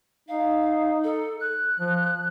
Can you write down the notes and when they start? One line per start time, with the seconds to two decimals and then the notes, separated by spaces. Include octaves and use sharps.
0.28 D#4 F5
1.04 A4
1.41 F#6
1.80 F3